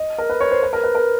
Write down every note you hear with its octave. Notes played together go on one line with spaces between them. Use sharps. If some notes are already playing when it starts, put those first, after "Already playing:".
Already playing: D#5
A#4
B4
C#5
C5
B4
A#4
B4
A#4